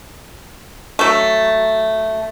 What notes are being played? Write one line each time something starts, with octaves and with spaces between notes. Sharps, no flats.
F#3 A3